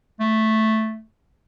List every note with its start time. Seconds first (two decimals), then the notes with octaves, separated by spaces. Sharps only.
0.20 A3